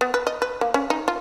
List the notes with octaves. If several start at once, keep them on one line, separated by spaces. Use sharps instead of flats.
B3
B4
D#5
B4
A#3
C#4
D#4
F4